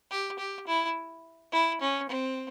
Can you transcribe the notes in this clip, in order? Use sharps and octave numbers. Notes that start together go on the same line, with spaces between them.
G4
G4
E4
E4
C#4
C4